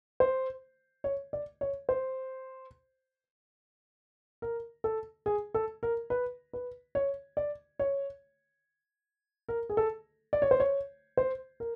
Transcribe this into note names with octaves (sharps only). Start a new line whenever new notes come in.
C5
C#5
D5
C#5
C5
A#4
A4
G#4
A4
A#4
B4
B4
C#5
D5
C#5
A#4
G#4
A4
D5
C#5
C5
C#5
C5
A#4